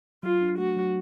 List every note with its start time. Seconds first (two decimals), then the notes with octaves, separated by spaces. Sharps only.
0.23 F#3 F4
0.42 D4
0.59 A3 F#4
0.76 F#3